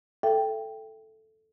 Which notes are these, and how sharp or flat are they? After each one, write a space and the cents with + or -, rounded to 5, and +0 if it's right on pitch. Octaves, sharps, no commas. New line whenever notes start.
A4 +0 E5 +25 G5 +0